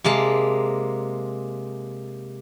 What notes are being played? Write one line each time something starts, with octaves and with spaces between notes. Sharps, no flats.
C3 G#3 A#3 A5